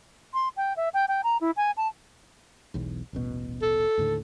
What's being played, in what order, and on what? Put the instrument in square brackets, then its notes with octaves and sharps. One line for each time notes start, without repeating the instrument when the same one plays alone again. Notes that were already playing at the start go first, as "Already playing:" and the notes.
[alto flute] C6
G5
E5
G5
G5
A#5
E4
G#5
A5
[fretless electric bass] E1 B1 E2
D#1 A1 B2
[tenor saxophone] A4
[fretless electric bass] D#2 A2 D3